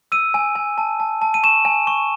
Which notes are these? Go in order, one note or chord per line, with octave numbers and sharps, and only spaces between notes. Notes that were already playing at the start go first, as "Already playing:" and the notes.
E6 D#7
G#5
G#5
A5
A5
A5
D#7
C#6 E7
G#5
C#6